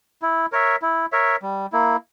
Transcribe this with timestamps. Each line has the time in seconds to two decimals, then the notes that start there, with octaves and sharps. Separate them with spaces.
0.22 E4
0.52 A#4 C#5 E5
0.82 E4
1.12 A#4 C#5 E5
1.42 G3
1.72 A#3 E4